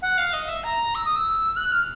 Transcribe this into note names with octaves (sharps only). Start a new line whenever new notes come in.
F#5
F5
D#5
E5
A#5
E6
D#6
E6
F#6
F6